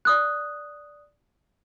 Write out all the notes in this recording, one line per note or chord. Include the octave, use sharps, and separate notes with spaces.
D5 D#6 F#6